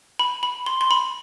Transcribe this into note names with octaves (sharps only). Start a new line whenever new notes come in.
B5
B5
C6
C6
B5